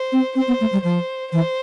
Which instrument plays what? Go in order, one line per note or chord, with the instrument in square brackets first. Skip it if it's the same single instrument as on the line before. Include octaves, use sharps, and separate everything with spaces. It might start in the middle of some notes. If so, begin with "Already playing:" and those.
Already playing: [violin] C5
[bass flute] C4
[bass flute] C4 [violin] C5
[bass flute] B3
A3
G3
[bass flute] F3 [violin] C5
[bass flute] E3 [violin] C5